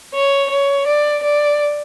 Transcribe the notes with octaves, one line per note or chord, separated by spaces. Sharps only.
C#5
C#5
D5
D5